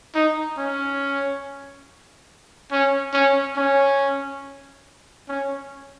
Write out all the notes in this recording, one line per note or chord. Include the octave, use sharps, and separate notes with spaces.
D#4
C#4
C#4
C#4
C#4
C#4